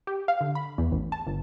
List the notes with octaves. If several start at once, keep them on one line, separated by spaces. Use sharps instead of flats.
G4
F5
D3
B5
E2
A1
A5
G1